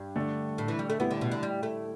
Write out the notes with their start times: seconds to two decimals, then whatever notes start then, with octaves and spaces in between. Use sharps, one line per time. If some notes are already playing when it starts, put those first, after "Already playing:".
Already playing: G2
0.16 D3 A3 D4 A4
0.58 A2
0.68 E3
0.79 G3
0.90 A3
1.00 A2 G3 B3 E4
1.11 D3
1.21 B2
1.32 D3
1.43 G3
1.63 A3